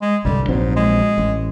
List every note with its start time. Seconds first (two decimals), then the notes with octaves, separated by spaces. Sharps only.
0.02 G#3
0.25 C2 G2 D3 G3
0.49 A#1 G#2 F#3 C4
0.76 G#3
1.18 A1